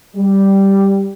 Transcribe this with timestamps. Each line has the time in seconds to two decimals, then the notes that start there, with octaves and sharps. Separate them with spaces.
0.16 G3